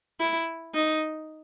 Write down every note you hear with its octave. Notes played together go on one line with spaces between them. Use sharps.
E4
D#4